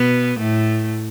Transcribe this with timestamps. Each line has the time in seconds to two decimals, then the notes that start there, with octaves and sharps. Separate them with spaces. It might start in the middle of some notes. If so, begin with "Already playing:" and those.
Already playing: B2 B3
0.39 A2 A3